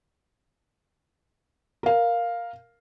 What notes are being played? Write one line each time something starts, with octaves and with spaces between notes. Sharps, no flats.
A#4 F5